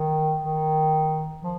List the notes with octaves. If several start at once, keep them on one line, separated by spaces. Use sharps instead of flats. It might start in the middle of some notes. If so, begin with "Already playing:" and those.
Already playing: D#3
D#3
F3